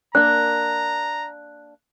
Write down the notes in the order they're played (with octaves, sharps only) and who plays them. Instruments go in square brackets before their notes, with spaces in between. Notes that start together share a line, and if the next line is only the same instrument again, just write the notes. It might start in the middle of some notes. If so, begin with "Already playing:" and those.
[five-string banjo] A#3 D4 [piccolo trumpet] A#5 [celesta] F#6